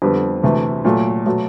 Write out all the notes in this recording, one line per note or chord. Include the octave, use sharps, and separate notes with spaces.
F2 D3 G3 B3
D2 C3 E3 A3
A#2 F#3 A3
B2 F#3 A3